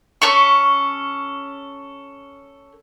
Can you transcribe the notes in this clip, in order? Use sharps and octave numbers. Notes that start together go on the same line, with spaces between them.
C#4 A4 C#6